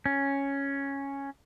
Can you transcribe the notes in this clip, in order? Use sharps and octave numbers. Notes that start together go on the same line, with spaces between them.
C#4